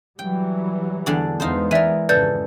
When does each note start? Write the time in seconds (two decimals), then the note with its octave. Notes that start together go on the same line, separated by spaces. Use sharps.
0.19 E3 F#3 G3 G5
1.06 E2 D3 D5
1.40 E2 G#3 B3 D#4 F4 C5
1.71 E3 A#4 D5 E5 D#7
2.09 G#1 F2 C#3 A4 B4 D5 G6